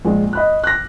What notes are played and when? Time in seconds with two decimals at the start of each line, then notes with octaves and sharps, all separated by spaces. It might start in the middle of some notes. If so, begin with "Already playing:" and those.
0.05 A#1 G#3
0.33 D#5 B5 F#6
0.64 F#6 A#6